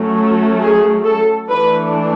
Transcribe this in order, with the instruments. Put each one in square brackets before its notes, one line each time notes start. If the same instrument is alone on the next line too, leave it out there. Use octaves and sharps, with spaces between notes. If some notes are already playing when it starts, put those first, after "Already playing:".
Already playing: [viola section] F#3 A3 C#4
G#4
A4
E3 A3 D4 B4